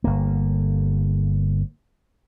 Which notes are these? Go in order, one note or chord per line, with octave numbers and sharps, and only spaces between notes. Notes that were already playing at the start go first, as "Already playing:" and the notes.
G1 A#3